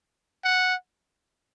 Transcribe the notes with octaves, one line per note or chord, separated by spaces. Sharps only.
F#5